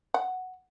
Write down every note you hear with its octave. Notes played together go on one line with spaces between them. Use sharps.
F#5